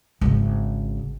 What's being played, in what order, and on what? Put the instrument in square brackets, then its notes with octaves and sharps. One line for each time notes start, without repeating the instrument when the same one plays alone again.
[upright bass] G#1 C#3